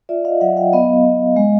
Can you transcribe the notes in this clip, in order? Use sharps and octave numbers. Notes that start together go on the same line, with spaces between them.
F4 D5 E5
D#5 F5
F#3 E5 F#5
F5 G5
B3 D#5 F5
B3
G#3